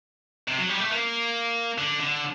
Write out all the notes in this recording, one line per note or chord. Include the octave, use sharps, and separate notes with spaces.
C3
F#3
G3
A3
A#3
D3
D3